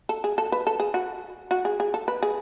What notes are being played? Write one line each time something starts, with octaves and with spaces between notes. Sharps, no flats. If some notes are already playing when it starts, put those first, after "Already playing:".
A4
G#4
A4
B4
A4
G#4
F#4
F#4
G#4
G#4
A4
B4
G#4